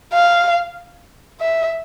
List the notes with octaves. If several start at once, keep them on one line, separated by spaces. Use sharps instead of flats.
F5
E5